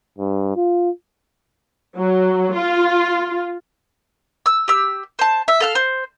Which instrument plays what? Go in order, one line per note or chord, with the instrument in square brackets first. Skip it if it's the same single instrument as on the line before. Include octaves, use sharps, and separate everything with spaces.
[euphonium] G2
F4
[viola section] F#3
F4
[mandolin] E6
G4 E6
C5 A5
E5
A4 F5 F6
C5